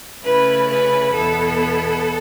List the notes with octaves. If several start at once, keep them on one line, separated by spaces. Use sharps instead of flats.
C#3 A3 C#4 E4 B4
B4
E2 B2 B3 E4 A4